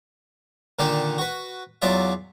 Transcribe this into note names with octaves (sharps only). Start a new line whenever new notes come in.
A#2 D3 D#3 D4 D#4 G4
F#4 B4
E2 F#3 F4 D5 E5